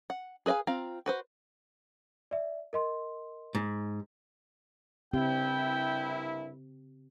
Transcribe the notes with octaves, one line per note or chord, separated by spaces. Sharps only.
F#5
G#4 B4 D#5 F5 G#5
C4 F4 F5 A#5
F#4 B4 C5
D5 E5
A#4 D#5 C6
G#2
C2 G2 C#3 C4 E4 G4 G5